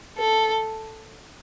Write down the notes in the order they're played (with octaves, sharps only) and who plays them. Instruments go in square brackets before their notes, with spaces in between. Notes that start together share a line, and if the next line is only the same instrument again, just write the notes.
[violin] A4